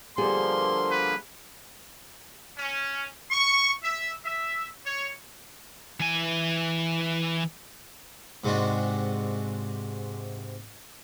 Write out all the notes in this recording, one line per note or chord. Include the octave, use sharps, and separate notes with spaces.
D3 F3 G3 A#3 B3 G#4 C6
B4
C#4
C#6
E5
E5
C#5
E3 G#5
G#2 C3 G#3 C4 D4 F#4